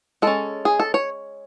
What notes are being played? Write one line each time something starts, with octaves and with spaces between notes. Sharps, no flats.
G#3 C#4 A4
G#4
A4
C#5